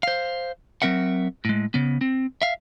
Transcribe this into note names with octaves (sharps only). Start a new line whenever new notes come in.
C5 F5
F#3 C4 A#4 E5 F#5
A2 G#3
C#3 B3
C4
E5 F5